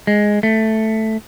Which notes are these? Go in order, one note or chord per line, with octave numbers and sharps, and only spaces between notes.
G#3
A3